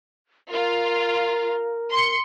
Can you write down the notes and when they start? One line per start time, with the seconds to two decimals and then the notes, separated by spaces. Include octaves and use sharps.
0.51 F4 A#4
1.91 C6 C#7